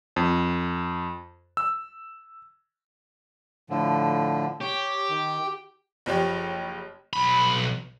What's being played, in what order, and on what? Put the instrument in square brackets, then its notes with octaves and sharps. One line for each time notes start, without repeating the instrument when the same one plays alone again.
[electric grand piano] F2
E6
[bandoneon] A2 D3 F3
[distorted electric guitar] G4 [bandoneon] C#5
[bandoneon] D#3
[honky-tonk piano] F#1 F3 G4 C#5
[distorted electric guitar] B1 B5